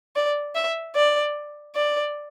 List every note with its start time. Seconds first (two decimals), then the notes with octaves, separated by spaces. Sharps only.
0.16 D5
0.55 E5
0.96 D5
1.76 D5